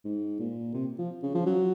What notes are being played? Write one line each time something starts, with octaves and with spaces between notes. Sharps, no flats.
G#2
A#2
C3
F3
C#3
F3
F#3